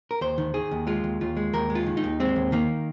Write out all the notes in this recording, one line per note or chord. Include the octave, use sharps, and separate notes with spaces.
A#4
D#2 C5
D#3
D#3 G#4
D#2
G#3 F4
D#2
D#2 F4
G#3
D#2 A#4
G#3
F4
D#3
D#4
D#2
G#3 C4
D#2
D#3 A#3